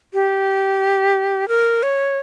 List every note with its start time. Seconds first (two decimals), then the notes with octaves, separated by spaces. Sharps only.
0.14 G4
1.48 A#4
1.83 C#5